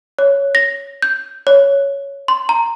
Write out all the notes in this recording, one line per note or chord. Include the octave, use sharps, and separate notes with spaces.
C#5
A#6
G6
C#5
C6
A#5